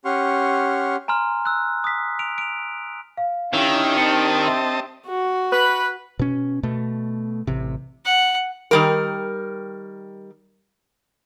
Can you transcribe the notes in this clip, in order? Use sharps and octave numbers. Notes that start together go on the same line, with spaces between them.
C#4 G4 F#5 C6 C#6 F6
G#5 A#5 C6 F6
E6 F#6
D#6 B6
D7 F7
D7 F7
F5
D#3 C#4 D4 E4 G4
C4 D#5 A5 C#7
E5 C6 E6
F#4
B4
B2 C#4
B2 A3
A1 C3
F#5
D#3 G3 A#4